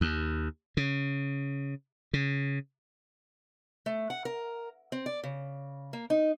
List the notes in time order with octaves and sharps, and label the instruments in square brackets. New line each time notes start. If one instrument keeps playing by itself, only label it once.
[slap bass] D#2
C#3
C#3
[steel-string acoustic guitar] A3
F#5
A#4
C4
D5
C#3
A#3
D#4